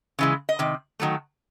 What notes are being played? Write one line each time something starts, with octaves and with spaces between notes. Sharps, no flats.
C#3 E3 G#3
D#5
C3 D#3
D#3 F#3 A3